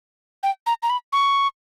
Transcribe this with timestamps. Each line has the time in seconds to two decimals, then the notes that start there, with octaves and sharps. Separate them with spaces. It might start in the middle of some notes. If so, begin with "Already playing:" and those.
0.43 G5
0.67 A#5
0.83 A#5
0.90 B5
1.13 C#6